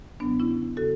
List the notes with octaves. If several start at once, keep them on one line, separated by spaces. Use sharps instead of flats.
E2 C#3 F#3 B3 D4
C#4 E4
C#3 F#4 A4